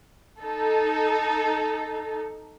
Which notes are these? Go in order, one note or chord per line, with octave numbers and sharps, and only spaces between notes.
D#4 A4